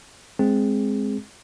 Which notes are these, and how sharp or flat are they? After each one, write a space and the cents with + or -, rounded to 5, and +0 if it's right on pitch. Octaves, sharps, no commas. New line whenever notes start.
G#3 +0 C4 +0 G#4 +0